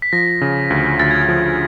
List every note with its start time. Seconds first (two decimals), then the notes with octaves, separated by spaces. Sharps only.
0.02 B6
0.13 F3 A#6
0.41 C#3
0.70 D2
0.99 D2 A6
1.11 G#6
1.22 A6
1.29 F3